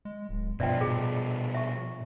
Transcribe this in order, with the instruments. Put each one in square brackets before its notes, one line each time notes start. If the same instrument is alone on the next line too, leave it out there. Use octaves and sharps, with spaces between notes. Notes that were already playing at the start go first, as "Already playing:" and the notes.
[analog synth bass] G#3
D1
[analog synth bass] G2 [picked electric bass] B2 F3 [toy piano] D5 E5 G5
[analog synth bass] A#2 [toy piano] G#4
[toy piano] E5 C#6